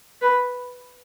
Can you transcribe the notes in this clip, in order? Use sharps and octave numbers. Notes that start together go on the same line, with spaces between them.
B4